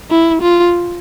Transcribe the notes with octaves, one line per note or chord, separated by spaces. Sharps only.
E4
F4